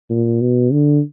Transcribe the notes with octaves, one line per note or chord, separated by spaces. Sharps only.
A#2
B2
D3